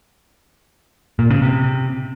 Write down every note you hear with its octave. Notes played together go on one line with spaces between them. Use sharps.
A#2
C#3
C3